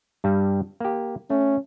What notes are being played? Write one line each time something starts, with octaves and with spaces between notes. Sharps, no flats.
G2 G3
A#3 G4
A3 C#4